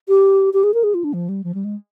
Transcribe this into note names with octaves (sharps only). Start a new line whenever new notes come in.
G4
G4
G#4
A#4
G#4
F4
D4
F3
G3
F3
G3
G#3